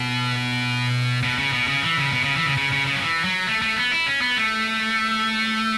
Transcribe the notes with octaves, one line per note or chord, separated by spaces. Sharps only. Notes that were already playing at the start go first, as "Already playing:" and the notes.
Already playing: B2
B2
C#3
B2
C#3
E3
C#3
B2
C#3
E3
C#3
C#3
C#3
C#3
F#3
E3
F#3
A3
A3
B3
E4
C#4
B3
A3